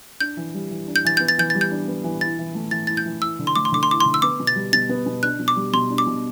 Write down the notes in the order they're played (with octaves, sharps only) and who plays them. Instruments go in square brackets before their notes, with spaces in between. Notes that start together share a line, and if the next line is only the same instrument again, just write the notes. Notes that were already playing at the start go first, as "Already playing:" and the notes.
[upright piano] D4 [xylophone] G6
[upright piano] E3
G3
E3
D4
[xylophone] G6
[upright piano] E3 [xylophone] A6
[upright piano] B3 [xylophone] G6
[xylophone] A6
[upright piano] E3 [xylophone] G6
[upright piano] G3 [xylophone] A6
[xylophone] G6
[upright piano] D4
B3
E3
[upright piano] E4 [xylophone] A6
[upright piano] E3
A3
[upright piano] E3 [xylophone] A6
[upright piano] E4 [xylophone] A6
[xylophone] G6
[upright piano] E3
[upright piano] E4 [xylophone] E6
[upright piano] D3
[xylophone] C6
[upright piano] A3 [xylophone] D6
[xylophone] C6
[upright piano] D3 [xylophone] D6
[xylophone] C6
[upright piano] E4 [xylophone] D6
[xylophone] C6
[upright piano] D3
[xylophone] E6
[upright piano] B3 [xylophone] D6
[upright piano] B2
[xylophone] A6
[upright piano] G3
[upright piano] B2 [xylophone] A6
[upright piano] B3
B2
[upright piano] D4 [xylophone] F#6
[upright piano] B2
[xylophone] D6
[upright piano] G3
[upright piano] B2 [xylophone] C6
[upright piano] D4
[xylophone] D6
[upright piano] B2